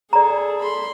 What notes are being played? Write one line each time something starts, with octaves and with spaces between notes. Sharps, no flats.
G#4 A4 D5 A#5
B5 C6